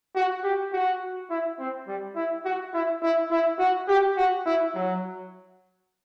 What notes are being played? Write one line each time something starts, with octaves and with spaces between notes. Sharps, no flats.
F#4
G4
F#4
E4
C4
G3
E4
F#4
E4
E4
E4
F#4
G4
F#4
E4
F#3